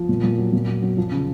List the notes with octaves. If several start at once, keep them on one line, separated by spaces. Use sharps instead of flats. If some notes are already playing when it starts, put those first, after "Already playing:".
Already playing: F3 F4
A#2
A#2
F#3
A#2
F#3
F#3
F3
C#3